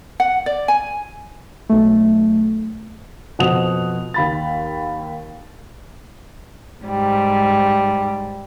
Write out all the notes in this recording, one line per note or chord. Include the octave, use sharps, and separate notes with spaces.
F#5
D5
G#5
B1 A3
F2 B2 F#5 D#6 F7
D#2 B5 A6
G#2 G3